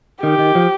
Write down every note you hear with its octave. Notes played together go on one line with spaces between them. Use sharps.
D#3 G4
D#3
F3